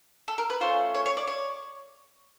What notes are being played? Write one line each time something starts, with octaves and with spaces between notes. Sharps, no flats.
A4
A#4
B4
A3 C#4 F4 C5
C#5
C#5
D5
C#5